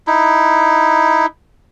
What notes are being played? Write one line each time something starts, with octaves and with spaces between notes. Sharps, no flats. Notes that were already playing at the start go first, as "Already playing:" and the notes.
D#4 E4